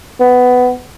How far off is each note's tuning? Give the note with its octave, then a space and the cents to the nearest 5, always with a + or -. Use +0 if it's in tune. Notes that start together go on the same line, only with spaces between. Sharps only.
B3 +15